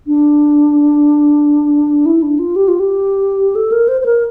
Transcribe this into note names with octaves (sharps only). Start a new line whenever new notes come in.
D4
E4
D4
F4
G4
F4
G4
A4
A#4
C5
C5
A#4